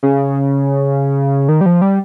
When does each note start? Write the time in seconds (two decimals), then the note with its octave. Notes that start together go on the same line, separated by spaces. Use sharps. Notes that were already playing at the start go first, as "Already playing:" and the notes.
0.03 C#3
1.49 D#3
1.61 G3
1.66 F3
1.82 G3